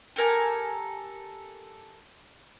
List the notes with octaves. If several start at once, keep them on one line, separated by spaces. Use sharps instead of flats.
G4 A4 A#4 G#5